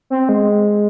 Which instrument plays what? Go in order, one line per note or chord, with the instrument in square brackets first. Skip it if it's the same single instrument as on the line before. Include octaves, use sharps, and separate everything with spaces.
[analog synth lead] C4
G#3